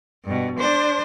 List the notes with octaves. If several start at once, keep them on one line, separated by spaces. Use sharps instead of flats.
G2 B2
D4 C5